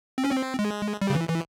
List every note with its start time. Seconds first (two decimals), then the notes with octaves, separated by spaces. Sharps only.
0.18 C4
0.24 C#4
0.31 C4
0.59 G#3
1.02 G3
1.10 C#3
1.15 E3
1.29 E3